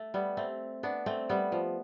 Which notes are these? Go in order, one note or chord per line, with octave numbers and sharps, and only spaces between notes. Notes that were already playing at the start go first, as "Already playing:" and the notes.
Already playing: A3
G3 B3
A3 C4
B3 D4
A3 C4
G3 B3
F3